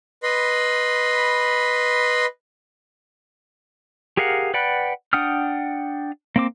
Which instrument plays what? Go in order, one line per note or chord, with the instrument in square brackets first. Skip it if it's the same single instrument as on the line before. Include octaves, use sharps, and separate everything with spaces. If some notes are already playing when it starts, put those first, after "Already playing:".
[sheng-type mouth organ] B4 D#5 B5 C6
[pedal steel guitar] G4 G#4 A#4 F5 F#5
B4 D5 F#5 G5 B5
D4 F#5 G5 D#6 F6
A#3 C4 D6